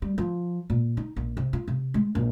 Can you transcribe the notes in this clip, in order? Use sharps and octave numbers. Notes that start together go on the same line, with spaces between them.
G3
F3
A#2
D#4
A#1
C3
F4
C3
G#3
A#1